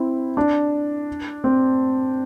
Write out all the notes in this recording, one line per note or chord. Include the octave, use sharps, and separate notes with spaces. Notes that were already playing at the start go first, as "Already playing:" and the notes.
Already playing: C4 E4
D4
C4